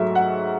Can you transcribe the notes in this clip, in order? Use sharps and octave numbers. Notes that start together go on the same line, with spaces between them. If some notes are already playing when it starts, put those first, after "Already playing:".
Already playing: G#2 F#3 A3 E5
F#5